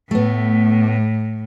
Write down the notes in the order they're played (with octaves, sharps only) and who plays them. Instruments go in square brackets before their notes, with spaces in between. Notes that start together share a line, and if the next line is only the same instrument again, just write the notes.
[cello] A2 [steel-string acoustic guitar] A3 B3